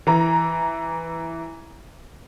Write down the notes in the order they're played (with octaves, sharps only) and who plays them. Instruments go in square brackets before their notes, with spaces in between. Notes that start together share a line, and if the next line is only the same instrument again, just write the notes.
[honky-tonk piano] E3 A#5